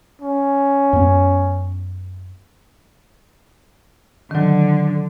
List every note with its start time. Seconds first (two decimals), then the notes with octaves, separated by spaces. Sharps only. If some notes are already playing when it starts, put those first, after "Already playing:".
0.22 C#4
0.93 F#2 B3
4.31 D3 D#3 F#3